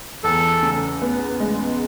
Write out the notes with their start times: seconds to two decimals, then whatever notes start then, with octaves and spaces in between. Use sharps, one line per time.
0.24 E2 A4
0.63 C#3
1.02 B3
1.40 G#3